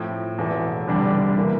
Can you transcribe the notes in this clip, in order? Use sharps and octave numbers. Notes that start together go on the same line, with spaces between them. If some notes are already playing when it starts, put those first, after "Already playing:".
Already playing: A2 F3 C4
E1 E2 E3 A3
F1 E2 D3 G3 D4
E3 A#3